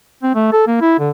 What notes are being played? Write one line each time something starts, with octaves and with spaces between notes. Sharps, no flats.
C4
A3
A4
A#3
E4
D3